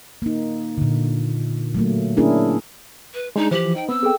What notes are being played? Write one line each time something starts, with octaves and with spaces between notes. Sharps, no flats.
A#3 D#4
A#2 D3
F#3 A3 A#3
A#3 C#4 D4 E4 G#4 A#4
B4
G#3 D4 D#4 G#4
E3 F3 G4 C5 F#7
D#4 G5
B3 C4 E6
G#4 A4 G5